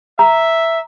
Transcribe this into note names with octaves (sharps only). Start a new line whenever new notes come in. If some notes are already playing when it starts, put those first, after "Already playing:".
E5 A#5